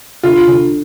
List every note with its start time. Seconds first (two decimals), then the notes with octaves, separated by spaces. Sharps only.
0.23 D3 F4
0.47 D3